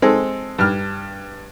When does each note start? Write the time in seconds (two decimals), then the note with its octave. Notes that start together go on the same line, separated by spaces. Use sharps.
0.02 G#3 C4 A4
0.58 G2 F6